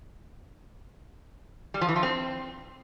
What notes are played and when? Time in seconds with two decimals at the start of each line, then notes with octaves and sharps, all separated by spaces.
1.74 G3
1.81 F3
1.89 E3
1.96 F3
2.03 C4